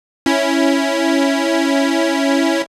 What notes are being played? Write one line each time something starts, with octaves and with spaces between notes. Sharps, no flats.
C#4 E4